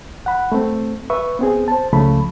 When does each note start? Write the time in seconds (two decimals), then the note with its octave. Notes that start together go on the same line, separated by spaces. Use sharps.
0.26 F#5 B5
0.52 A3 C4
1.10 B4 E5 C#6
1.39 B3 C4 G#4
1.68 C5 A5
1.93 C#2 C#3 F3 A3 A4 B5